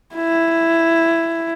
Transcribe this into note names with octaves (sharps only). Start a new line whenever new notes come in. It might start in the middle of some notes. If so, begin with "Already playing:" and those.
E4